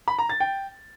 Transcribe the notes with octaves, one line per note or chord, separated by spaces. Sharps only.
B5
A#5
A6
G5